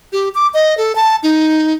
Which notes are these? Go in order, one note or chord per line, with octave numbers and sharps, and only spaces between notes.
G4
D6
D#5
A4
A5
D#4